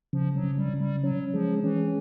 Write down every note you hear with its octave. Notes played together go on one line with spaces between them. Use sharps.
C#3 F3
F#3
C#3
G3
C#3
G3
F#3 C#4
F3 G#3
E3 C#4